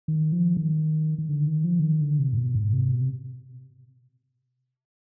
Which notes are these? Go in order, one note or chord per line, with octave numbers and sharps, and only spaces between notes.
D#3
F3
D#3
D#3
D3
D#3
F3
D3
D#3
D3
C3
G#2
B2
G#2
C3
B2
C3